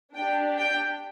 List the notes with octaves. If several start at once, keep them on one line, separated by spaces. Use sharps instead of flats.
D4 G4 G5
G5